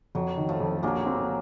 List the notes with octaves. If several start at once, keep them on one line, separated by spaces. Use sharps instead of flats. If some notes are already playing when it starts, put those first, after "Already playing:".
F2 F#3
D#3
F3 A3
F2
A#1 F#3 A#3
C4